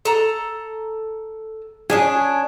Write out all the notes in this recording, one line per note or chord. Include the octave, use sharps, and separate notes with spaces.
A4 A#5
C#4 D4 G#4 C#5